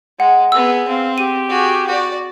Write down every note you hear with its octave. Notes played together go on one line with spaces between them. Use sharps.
G#3 F#5
B3 G#4 E6
C4 F5
G4 D#7
F#4 G#4
F#4 D5